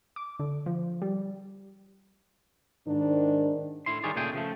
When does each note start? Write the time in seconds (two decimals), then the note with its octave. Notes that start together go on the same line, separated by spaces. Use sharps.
0.16 D6
0.40 D3
0.66 F3
1.02 G3
2.87 G#2 D#3 D4
3.86 A2 E4 C6
4.03 D#3 G3 D#4 G#4 C#5 D5
4.15 D#2 A#2 C#3 A3 G#4 G5
4.33 C#3 F3 A3